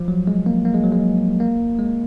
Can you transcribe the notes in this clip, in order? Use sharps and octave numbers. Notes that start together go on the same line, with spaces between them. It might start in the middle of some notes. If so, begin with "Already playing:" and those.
Already playing: F3
F#3
G#3
A#3
A#3
G#3
F#3
G#3
A#3
G#3